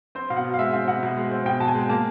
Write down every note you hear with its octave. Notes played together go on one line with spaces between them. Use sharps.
C4 C5
B2 F5
F#5
B2
F5
G#3 E5
C4 F5
B2 F#5
B2
G#3
C4
B2 G5
B2 A5
G#5
G#3
A#3 A5